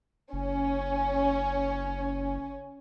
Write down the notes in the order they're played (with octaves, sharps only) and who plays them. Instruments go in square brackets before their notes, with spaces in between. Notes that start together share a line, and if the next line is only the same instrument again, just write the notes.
[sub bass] F#1 [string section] C#4